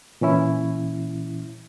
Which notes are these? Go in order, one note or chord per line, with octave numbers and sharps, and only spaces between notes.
A#2 E3 C#4 E4